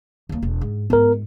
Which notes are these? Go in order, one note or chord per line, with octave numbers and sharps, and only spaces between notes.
D#2 A#3
E1
G#2
G#2 B3 F4 A#4